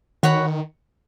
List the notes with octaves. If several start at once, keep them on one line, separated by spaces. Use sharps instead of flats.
D#3 F#4 C#5 F#5 B5